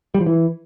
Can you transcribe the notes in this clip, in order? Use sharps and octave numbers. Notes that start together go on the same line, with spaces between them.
G3
F3
E3